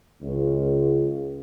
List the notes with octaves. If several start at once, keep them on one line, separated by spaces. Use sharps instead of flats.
C#2